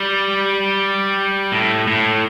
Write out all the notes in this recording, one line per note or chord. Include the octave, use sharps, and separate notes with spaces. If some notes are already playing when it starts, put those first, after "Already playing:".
Already playing: G3
A2
A2